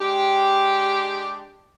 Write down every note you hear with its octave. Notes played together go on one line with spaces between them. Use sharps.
G#3 D4 G4